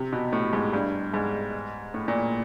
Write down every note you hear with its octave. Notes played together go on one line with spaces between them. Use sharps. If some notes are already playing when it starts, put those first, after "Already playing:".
Already playing: C3
B2
A2
G#2
G2
G#2
A2
A#2